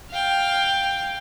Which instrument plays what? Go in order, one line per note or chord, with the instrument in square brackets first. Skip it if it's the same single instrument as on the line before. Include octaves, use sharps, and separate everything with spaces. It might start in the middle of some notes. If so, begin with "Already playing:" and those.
[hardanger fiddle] F5 G5